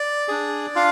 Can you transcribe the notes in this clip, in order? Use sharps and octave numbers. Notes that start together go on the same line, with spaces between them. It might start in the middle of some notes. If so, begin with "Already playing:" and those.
Already playing: D5
D4 G#4
D4 F4 F5